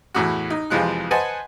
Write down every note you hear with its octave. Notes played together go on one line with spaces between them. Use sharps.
E2 A2 F#4
D#4
F2 C3 E3 F3 G#3 F#6
B4 C5 D#5 F#5 G#5 A5